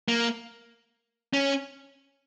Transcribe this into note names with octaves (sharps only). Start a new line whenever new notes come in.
A#3
C#4